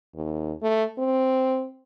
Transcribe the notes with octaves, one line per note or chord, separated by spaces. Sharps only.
D#2
A3
C4